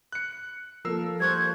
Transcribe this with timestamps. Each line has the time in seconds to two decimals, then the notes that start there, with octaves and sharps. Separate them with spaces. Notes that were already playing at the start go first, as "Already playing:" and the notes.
0.12 F#6 C#7
0.85 F3 A#3 A4 A#4 E6 C7
1.20 G3 C5 C#6 F#6 G#6